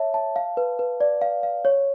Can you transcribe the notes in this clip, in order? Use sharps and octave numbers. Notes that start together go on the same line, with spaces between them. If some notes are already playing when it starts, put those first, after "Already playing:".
Already playing: C#5 E5 A5
A5
F5
B4
B4
D5
F5
F5
C#5